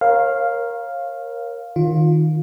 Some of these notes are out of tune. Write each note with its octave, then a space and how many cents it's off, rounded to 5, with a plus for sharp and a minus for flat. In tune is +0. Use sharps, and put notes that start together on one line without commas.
A#4 +10 C#5 -30 F5 +0
D#3 +0 F4 +20